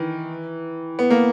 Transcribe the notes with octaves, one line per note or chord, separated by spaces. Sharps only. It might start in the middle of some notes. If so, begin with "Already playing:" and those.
Already playing: D#3 E3
B3
A#3